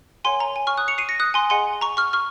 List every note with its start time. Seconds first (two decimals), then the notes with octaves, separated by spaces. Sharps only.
0.25 A#4 C#5 F#5 G#5 C6
0.40 A#5
0.56 G#5
0.67 C#6 F6
0.77 D#6 F#6
0.88 C#7 F7
0.98 C7 D#7
1.09 A#6 C#7
1.20 D#6 F#6
1.34 G#5 C6
1.50 G#4 D#5 F#5 G#5 C6
1.81 A#5 C#6
1.97 C#6 F6
2.13 C#6 F6